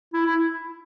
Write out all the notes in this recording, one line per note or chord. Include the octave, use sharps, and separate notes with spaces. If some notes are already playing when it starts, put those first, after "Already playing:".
E4
E4